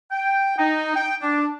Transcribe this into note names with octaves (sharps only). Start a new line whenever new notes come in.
G5
D#4
G5
D4